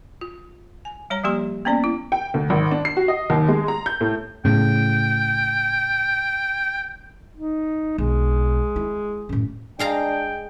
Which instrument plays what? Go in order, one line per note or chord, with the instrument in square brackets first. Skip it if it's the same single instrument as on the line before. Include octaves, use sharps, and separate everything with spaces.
[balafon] F4
G#5
G3 C#5 A#5
F3 G3 A#3 G4 C6
A#3 B3 C#4 D5
E4
[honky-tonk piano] G5
D2
G#1
D4
C7
F#4
D#5
D#2
G#3
A#5
G6
A2
[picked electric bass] A2 C#3 [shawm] G5
[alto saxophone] D#4
[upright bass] B1 [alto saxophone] G#3
[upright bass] E4
F#2 A2
[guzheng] G#3 F5 A#5 [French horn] D4 [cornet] G5